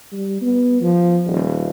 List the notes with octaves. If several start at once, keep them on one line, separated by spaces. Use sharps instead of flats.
G3
B3
F3
D#1